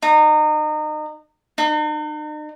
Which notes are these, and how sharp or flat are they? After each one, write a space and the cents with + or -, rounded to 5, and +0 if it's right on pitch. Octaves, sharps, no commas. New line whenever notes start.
D#4 -30
D#4 -45